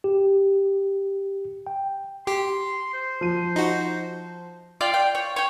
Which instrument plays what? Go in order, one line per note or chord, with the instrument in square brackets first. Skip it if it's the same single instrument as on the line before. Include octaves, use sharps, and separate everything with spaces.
[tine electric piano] G4
G5
[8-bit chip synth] G4 [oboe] C6
[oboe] C5
[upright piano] F3 D#7
[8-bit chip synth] D#4 F#4
[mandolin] F4 D5 G5
G5
C#5
C#5 G5